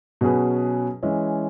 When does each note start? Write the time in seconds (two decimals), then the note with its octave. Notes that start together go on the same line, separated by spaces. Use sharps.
0.21 B2 F#3 C#4 G#4 B4
1.03 E3 G#3 C#4